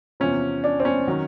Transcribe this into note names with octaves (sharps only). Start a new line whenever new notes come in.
E2 C3 F3 C#4
D4
C4
C#4
D#3 F#3